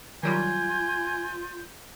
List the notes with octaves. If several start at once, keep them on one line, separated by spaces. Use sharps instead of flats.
D#3 F#3 G3 F4 G#5 G6